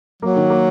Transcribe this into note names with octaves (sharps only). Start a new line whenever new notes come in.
F#3 A#3
D#3
A#3